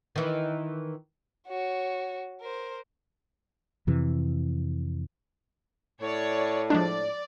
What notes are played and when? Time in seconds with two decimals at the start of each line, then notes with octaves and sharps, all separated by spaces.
0.16 D#3 E3
1.48 F#4 C#5
2.41 A#4 C5
3.87 F2 C3 E3
6.01 A2 C#5 D5
6.70 F3 G#3 D4 D5